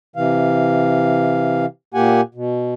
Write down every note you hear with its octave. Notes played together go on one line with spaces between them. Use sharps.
C3 E3 F5
A#2 A#3 G4 F#5 G#5
B2